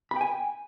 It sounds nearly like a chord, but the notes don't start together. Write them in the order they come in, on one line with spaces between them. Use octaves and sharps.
B5 G5 G#5